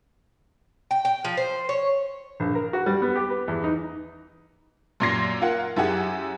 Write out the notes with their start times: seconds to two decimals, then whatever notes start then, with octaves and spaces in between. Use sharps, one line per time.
0.91 G5
1.05 G5
1.24 F3
1.37 C5
1.69 C#5
2.40 A#1
2.55 A#4
2.73 F#4
2.86 G3
3.02 B3
3.16 G4
3.30 B4
3.48 E2
3.64 D#4
5.00 F#2 A#2 C6 G#6 A#6 C7
5.41 F4 A#4 F#5
5.76 F#2 E4 G4 G#4 F#5